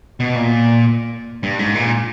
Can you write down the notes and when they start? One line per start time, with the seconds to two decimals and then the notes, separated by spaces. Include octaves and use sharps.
0.20 B2
0.35 A#2
1.43 G2
1.59 G#2
1.75 A#2